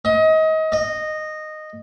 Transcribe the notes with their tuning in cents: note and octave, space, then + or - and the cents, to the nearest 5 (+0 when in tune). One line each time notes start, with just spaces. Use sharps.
D#5 +30
D#5 -10